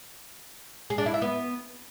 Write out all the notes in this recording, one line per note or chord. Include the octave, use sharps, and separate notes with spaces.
G#4
D4
E4
E5
B3